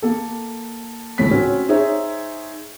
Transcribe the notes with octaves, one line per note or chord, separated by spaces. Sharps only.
A#3 A4
C#2 A2 B6
C4 C#4 F#4
D#4 G#4 C5 C#5 E5